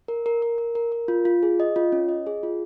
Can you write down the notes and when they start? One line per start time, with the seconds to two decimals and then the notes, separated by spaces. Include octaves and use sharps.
0.08 A#4
0.26 A#4
0.42 A#4
0.58 A#4
0.75 A#4
0.92 A#4
1.08 F4
1.25 F4
1.43 G#4
1.60 D#5
1.76 F4
1.92 C#4
2.09 D#5
2.27 G#4
2.43 F4